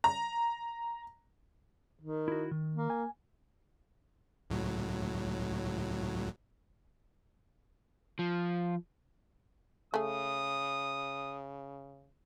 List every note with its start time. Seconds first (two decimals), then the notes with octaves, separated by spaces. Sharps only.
0.04 A#5
2.01 D#3
2.28 E4 F#4
2.51 D#3
2.75 A#3
2.90 G#5
4.50 C#2 A2 F#3
8.19 F3
9.94 C#3 A3 G#4 D#6